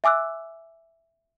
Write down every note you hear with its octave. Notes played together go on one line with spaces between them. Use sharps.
E5 G#5 D6 E6 F#6